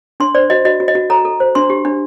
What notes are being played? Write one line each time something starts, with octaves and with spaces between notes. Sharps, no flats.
D4 C6
C5 D5
F#4 D#5
F#4 D#5
F#4
D#5
F#4
A4 A#5
A4
C5
D4 C6
G4
D4